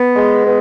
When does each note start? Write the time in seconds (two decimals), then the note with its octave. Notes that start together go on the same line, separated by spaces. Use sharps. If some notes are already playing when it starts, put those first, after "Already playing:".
Already playing: B3
0.16 G#3
0.45 B3